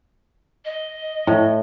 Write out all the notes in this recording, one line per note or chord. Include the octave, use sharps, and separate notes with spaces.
D#5
A2